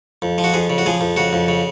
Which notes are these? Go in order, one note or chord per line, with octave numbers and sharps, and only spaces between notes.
F2
F3
F#4
F2 G#4
C#3
F#4
F3 G#4
F2
C#3 F#4
F2
C#3